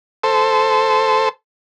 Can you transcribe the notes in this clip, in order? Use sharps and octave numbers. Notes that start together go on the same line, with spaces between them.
A4 C5